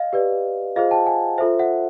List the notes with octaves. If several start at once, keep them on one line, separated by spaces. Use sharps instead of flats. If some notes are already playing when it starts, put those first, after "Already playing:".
Already playing: D#5 F5
G4 B4 D5
F4 G#4 C5 D#5 F5
G5 A5
F#5 G#5
F4 A4 C5 E5
E5 F#5